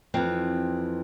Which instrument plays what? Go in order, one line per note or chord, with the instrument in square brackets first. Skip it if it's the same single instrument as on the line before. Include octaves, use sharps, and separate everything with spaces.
[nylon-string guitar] F2 E3 C4